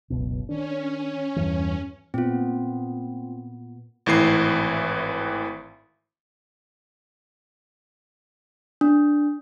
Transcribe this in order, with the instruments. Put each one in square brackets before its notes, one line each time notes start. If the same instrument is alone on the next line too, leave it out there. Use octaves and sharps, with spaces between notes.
[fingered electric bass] F#1 C#2 B2
[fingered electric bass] D#3 D4 [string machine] C#4
[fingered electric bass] E2 G2 E3
[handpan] A#2 B3 [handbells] C4 F4
[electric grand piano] G#1 A2 E3 C7
[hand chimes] D4